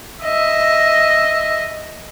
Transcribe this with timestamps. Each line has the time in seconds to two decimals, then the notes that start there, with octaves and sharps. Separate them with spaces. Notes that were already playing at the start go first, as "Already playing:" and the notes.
0.23 D#5 E5